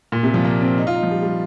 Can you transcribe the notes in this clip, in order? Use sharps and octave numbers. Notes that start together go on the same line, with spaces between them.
A#2
C3
F3
A#3
C4
D#4
F4
D#4
F3
G3
G3